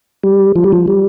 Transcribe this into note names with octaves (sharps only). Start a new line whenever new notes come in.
G3
F3
G3
F3
G3